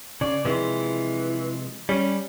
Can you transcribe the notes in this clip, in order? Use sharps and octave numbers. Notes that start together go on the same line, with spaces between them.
C#3 D5
C3 E3 F3 G#3
G3 C#4